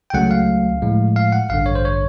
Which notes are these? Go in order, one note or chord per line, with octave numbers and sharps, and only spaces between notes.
G5
C#2 C#3 F#3 A3 F#5
F5
A2 F3 G#3
F5
F#5
A1 G2 D3 F5
C#5
C5
C#5